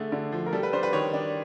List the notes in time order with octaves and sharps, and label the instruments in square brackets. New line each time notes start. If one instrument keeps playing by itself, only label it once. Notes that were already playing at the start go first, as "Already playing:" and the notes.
Already playing: [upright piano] D3 A3 G#4
D3
F3
A#4
G3 A4
B4
D4 C5
B4
D#3 C#5
D4